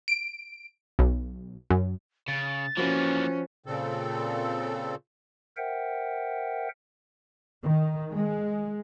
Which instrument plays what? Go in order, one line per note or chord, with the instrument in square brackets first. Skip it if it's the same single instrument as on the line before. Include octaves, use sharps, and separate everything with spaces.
[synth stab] D7
B1
F#2
[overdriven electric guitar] C#3 [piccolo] A6
[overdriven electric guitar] E3 A#3 [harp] F3 F#4 B4 [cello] C#4
[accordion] A#2 C#3 C4 A4
[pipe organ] A#4 C5 E5 F#5 G5
[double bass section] D#3
G#3